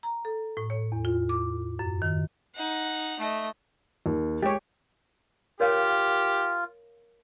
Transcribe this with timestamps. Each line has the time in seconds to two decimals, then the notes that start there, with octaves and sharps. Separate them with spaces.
0.03 A#5
0.25 A4
0.57 A2
0.70 C#5
0.92 E2
1.05 F4
1.29 D6
1.79 F#2
2.02 D#3
2.55 D#4 F#5
3.19 A3 D#5
4.06 D#2
4.43 G#3 G4 C#5
5.60 F4 G4 A#4 C#5 F5